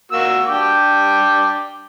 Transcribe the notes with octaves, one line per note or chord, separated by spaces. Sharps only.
A#3 F#4 E6
D4 G5 D6